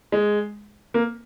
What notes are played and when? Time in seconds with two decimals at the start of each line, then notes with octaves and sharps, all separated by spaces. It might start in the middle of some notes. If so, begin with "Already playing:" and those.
0.12 G#3
0.94 A#3